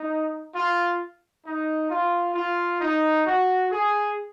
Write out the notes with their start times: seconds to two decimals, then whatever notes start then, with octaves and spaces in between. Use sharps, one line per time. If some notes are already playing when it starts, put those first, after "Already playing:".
Already playing: D#4
0.54 F4
1.45 D#4
1.90 F4
2.35 F4
2.80 D#4
3.26 F#4
3.71 G#4